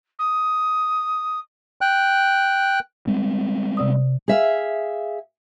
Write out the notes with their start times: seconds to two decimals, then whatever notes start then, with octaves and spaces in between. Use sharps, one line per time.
0.19 D#6
1.81 G5 F#6
3.07 G3 G#3 C4
3.77 C3 D5 D#6
4.28 G#4 E5 F5